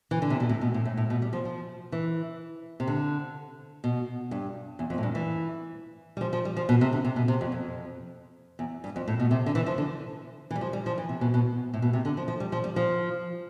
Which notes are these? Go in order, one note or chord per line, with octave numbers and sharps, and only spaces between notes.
E3
D3
C3
B2
A2
B2
A2
A2
A2
B2
G3
F3
F3
E3
C3
D3
B2
G2
E2
F2
A2
G2
E3
G3
F3
F3
G3
F3
B2
C3
D3
C3
B2
C3
F2
F2
E2
G2
F2
A2
B2
C3
D3
E3
F3
D3
E3
G3
F3
G3
F3
E3
C3
B2
B2
A2
B2
C3
D3
F3
F3
G3
F3
G3
F3